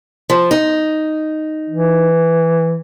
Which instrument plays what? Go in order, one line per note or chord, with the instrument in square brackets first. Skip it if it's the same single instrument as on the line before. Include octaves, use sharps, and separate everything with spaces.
[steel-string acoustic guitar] F3
D#4
[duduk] E3